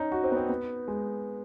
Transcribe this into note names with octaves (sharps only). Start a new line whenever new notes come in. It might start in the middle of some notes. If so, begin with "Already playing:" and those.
Already playing: C#4 D#4
F#4
C4
B3
C4
B3
G#3